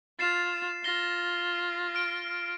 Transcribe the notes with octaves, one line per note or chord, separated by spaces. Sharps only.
F4 A6 C7 E7
F4 A#6 C7 G7
F6 D7